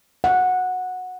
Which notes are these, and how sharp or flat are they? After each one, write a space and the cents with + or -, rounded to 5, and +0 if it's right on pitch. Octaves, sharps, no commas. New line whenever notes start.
F#5 -10